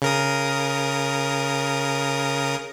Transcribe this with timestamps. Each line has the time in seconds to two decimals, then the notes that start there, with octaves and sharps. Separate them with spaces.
0.02 C#3 A#4 D#6